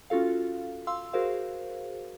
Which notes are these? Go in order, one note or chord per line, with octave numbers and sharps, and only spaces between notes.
C#4 F4 F#4 A4 F5
F5 C6 E6
F#4 G#4 A#4 C5 F5